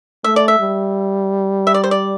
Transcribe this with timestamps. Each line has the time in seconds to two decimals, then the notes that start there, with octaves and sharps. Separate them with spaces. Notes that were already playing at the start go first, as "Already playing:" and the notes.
0.24 A3 E5
0.36 D5
0.48 E5
0.60 G3
1.67 E5
1.74 D5
1.84 C5
1.91 D5